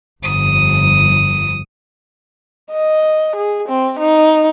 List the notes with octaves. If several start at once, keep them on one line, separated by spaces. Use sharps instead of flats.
G1 F2 D#6
D#5
G#4
C4
D#4